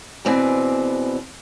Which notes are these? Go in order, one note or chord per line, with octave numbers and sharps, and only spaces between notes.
E2 B2 C4 D5 G#5